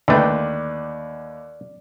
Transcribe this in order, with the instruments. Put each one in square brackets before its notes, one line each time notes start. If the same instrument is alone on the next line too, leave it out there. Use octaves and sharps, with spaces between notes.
[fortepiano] D#2 B4 G5 [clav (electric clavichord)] D3 A3 [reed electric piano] D5